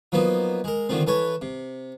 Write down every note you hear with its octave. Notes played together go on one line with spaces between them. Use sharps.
F3 F#3 A#3 B3 D#4
G#3 A#4
D3 D#3 F3 A3 C4
E3 A4 B4 C#5
C3